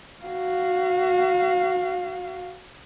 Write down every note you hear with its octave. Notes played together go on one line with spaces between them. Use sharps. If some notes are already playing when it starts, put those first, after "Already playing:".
F#4 F5